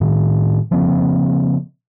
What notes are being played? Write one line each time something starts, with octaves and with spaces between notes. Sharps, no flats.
A2 D#3
C#3 F3 A#3 C4